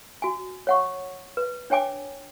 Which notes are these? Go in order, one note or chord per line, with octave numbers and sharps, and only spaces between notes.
F#4 G#5
C#5 F#5 C#6
B4
D4 C#5 G5 G#5 D6